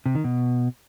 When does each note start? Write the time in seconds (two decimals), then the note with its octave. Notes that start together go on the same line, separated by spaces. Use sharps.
0.06 C3
0.15 D#3
0.24 B2